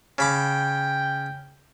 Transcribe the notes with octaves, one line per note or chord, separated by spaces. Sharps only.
C#3 G5 B5 D6